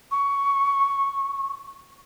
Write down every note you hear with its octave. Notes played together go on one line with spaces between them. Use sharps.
C#6